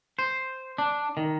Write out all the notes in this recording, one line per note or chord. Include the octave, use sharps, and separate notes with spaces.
C5
D4
D#3